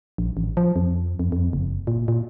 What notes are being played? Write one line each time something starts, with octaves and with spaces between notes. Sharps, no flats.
A#1
A1
F3
F2
F2
F2
F#1
A#2
A#2